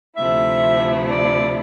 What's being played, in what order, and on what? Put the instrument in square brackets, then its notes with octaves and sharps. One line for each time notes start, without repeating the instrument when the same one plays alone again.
[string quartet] D2 C3 F3 A3 E4 [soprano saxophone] E5
[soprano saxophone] D5